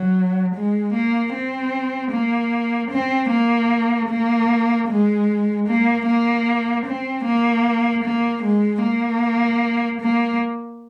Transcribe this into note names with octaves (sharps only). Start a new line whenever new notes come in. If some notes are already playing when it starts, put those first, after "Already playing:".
Already playing: F#3
G#3
A#3
C4
A#3
C4
A#3
A#3
G#3
A#3
A#3
C4
A#3
A#3
G#3
A#3
A#3